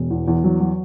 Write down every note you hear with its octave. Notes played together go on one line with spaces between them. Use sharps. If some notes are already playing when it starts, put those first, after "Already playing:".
Already playing: E1
E2
E2
F#3
F#3